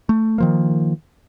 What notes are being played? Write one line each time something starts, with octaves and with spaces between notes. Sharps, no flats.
A3
D#3 F3 A#3